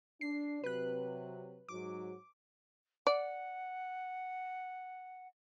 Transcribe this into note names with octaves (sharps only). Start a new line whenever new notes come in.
D4 C7
C3 F#3 B4 F#6
G#2 F#3 D6
D5 F#5